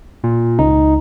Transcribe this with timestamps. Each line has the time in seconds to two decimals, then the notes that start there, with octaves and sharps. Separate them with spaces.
0.24 A#2
0.59 C#2 D#4